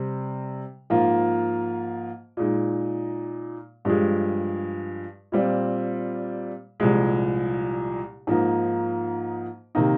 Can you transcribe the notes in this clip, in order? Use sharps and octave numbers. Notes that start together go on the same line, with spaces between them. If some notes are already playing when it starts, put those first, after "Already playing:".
Already playing: C3 G3 C4
G#2 F3 A#3 F4
A#2 G#3 D#4
G2 F3 G#3
A#2 G3 C4 F4
C2 A#2 F3 G#3
G#2 F3 A#3 D#4
C3 D#3 A#3 D#4